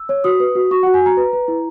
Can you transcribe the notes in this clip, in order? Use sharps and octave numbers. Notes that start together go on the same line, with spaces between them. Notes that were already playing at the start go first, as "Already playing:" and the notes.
Already playing: E6
C#5
F#4 D#6
B4
F#4
F#4 C#6
F#4 F#5
G#5
F#4 A#5
B4
B4
E4